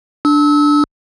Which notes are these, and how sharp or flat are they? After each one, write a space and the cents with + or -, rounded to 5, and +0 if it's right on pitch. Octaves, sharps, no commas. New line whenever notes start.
D4 +0 E6 -30